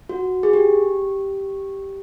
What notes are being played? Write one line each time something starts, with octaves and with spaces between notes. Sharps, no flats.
F#4
G#4
G4